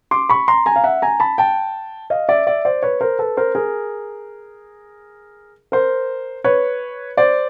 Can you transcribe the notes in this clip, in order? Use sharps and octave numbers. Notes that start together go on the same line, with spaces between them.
C6 D6
B5 C#6
A#5 C6
G#5 A#5
F5
E5 F#5
G#5 A#5
A5 B5
G5 A5
D#5 F5
D5 E5
D5 E5
C5 D5
B4 C#5
A#4 C5
A4 B4
A#4 C5
G#4 A#4
A#4 C5
B4 C#5
C5 D5